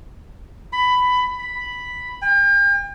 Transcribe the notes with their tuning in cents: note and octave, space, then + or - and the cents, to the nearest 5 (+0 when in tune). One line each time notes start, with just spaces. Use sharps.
B5 +15
B5 +0
G5 +40